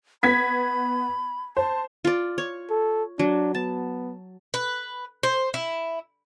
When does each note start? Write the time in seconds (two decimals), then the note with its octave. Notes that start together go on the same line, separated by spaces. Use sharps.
0.23 B3 B5 G#6 B6
1.57 C5 A5
2.05 F4 D5
2.38 C#5
2.70 A4
3.19 F#3 D4
3.55 B3 A5
4.54 B4
5.23 C5
5.54 E4